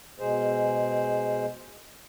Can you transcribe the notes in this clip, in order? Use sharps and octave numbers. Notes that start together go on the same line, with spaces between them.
B2 G#3 G#4 C5